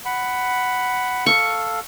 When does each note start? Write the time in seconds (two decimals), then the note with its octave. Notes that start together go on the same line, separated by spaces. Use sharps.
0.05 F#5 B5
1.26 A4 F5 C#6